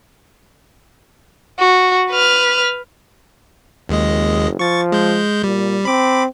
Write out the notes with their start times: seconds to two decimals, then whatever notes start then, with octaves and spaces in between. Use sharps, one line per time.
1.59 F#4
2.10 B4 F6
3.89 F#1 D#2 G#3 D#5
4.59 F3 C#6 A6
4.92 G#3 G6
5.44 A#2 G3
5.85 C4 B5 D6